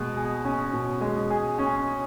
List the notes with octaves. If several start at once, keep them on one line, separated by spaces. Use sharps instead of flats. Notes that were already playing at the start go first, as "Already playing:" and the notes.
Already playing: B2 G#3
G#4
C#4
B2
G#3
G#4
C#4